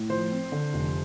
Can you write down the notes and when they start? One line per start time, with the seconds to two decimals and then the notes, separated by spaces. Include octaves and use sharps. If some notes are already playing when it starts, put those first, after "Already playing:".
Already playing: A2
0.10 F3 C5
0.32 C4
0.52 D3
0.74 F1